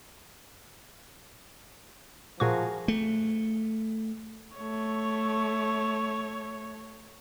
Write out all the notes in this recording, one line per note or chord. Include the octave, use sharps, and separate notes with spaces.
A#2 F3 F#4 G#4 A#4 C#6
A3
A3 C#5